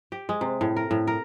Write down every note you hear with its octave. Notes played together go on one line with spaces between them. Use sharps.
G4
G#3
C3
A2
A#4
A2
A#4